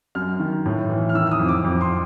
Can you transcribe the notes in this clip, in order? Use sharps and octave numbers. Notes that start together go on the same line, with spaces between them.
F#2 F6
D#3
A2
E3
F6
D#3 E6
E6
D#6
F2
D6
F2
C6